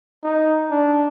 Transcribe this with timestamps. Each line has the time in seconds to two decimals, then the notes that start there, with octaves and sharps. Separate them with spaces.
0.23 D#4
0.70 D4